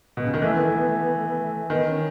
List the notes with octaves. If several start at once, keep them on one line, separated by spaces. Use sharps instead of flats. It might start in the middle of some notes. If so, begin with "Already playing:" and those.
B2
C#3
D#3
E3 A3
B3
A3
B3
A3
B3
A3
B3
A3
D#3 B3
C#4